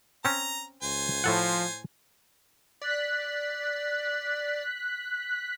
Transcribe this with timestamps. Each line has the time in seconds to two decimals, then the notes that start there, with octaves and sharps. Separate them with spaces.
0.25 C4 C#4 A#5
0.83 C#2 C5 G#5
1.24 A2 F3 A4 F#5
2.81 D5 F#6 B6